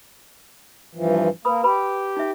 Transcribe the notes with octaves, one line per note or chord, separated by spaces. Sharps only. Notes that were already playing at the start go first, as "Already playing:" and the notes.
G2 E3 F3
A#3 B4 B5 D#6
G4 B4 B5
D#4 E5